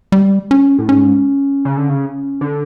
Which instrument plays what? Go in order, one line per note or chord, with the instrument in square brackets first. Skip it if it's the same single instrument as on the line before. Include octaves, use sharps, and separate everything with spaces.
[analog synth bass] G3
C#4
[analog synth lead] A2
[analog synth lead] G#2 [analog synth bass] C#4
[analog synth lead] C#3
D3
C#3
D3